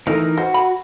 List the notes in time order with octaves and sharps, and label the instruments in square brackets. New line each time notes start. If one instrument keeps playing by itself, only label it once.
[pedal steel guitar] E3 D#4 A#4 [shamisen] A3
[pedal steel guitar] F#4 [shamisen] C5
[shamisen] B5